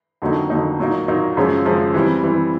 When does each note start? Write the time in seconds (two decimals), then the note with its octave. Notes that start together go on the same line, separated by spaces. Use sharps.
0.22 F2 D3 F#3 A#3 D#4
0.50 F2 D3 F#3 A#3 D#4
0.79 A#2 F#3 A#3 D#4
1.08 A#2 F#3 A#3 D#4
1.37 F#2 C#3 F3 G#3 C#4
1.65 F#2 C#3 F3 G#3 C#4
1.94 E3 G3 C4
2.24 E3 G3 C4